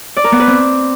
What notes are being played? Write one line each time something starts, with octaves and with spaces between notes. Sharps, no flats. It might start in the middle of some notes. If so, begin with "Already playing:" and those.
D5
A#4
B3
B4
C4